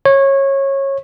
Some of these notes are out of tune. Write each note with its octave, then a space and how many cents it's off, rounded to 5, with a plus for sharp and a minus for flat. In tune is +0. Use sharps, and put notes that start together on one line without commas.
C#5 -20